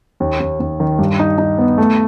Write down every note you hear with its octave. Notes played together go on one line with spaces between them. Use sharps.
D#2
D#2
D#2
D#3
G2
D#4
D#4
B3
A3